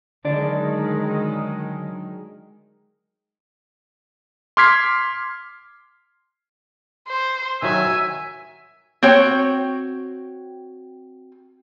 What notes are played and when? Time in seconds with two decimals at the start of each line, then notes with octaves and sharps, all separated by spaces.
0.25 D3 D#3 F#3 G#3 D5
4.57 C6 D6 F6 G#6 B6 C7
7.08 C5
7.62 D#3 F#3 E5 G#5
9.03 C4 F#4 C#5 G5